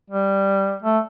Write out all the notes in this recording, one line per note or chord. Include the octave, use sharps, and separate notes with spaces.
G3
A3